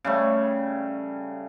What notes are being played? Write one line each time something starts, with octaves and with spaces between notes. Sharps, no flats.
C#3 G3 A3